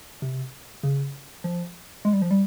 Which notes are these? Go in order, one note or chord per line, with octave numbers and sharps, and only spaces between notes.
C3
C#3
F3
G#3
G3
F3
G3